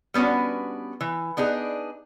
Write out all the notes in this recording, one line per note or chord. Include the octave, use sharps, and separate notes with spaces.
G3 B3 C#4 D4 F#4
E3
B3 D4 D#4 G#4